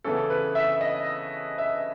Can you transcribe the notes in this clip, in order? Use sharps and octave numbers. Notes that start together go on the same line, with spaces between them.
C#3 E3 B3 A4
B4
E5
D#5
E5